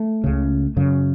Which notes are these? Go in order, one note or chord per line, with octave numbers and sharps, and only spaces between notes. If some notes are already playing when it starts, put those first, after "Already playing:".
Already playing: A3
C#2 C#3
F#2 C#3